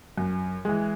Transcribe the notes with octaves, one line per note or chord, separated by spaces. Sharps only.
F#2
E3 G#3